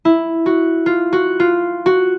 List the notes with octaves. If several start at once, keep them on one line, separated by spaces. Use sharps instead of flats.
E4
F#4
F4
F#4
F4
F#4